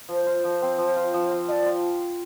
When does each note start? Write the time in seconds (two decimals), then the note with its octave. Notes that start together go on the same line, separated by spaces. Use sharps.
0.09 F3 C5
0.27 F4
0.44 F3
0.62 C4
0.78 F3
0.96 F4
1.14 F3
1.31 C4
1.48 F3 D5 D#5
1.66 F4